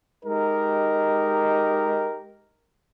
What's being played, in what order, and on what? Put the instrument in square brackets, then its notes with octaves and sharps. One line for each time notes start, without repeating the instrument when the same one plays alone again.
[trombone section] G#3 D#4 G4 A#4